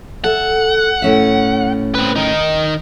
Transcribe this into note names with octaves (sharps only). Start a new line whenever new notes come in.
A4 E5 F#5
A2 C#4 E5
C4 B4
D#3 D#4